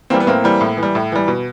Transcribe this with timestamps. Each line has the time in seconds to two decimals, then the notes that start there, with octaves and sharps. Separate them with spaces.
0.10 E3 A#3 C4
0.14 G3
0.20 B3
0.27 A2 A#3 C4
0.44 E3 G3
0.61 A2
0.77 E3
0.83 G3
0.95 A2
1.12 E3 G3
1.28 B2